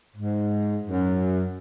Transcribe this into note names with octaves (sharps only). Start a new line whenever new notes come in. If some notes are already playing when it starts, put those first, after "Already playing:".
G#2
F#2